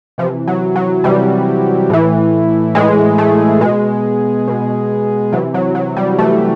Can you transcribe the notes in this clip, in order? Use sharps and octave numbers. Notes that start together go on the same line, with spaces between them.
C3 E3 F3
F#3
F#3
C3 E3 G3
A2 E3
A2 E3 G#3
A3
B2 G#3
B2
C3 E3 F#3
F#3
F#3
G3
C3 E3 A3